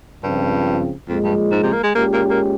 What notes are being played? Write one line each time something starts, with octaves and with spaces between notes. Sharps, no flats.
C#2 G2 C#3 F3 C4
F2 A#2 F3 G#3
G2
G#2
C3
A#3
G#3
A#2 G#3 A#3 C#4 G4
A#3
A#3